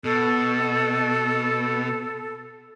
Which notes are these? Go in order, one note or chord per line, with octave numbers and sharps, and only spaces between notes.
B2 A4